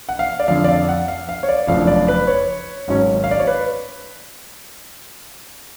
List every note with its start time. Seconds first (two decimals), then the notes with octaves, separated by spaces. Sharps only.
0.09 F#5
0.19 F5
0.40 D5
0.48 F2 D3 F3 F5
0.64 D5
0.68 F5
0.88 F#5
1.08 F5
1.29 F5
1.43 C#5
1.49 D5
1.67 F#1 F2 F3 A3 D4 F5
1.87 D5
2.08 B4
2.27 C#5
2.88 G#1 G#2 F#3 C#4
3.24 F5
3.31 D5
3.40 C#5
3.47 B4